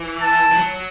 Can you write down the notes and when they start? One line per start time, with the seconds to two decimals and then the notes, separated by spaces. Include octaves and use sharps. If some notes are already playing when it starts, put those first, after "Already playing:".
Already playing: E3
0.22 A5
0.52 E3
0.57 F#3